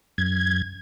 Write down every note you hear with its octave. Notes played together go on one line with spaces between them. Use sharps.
F#2 G#6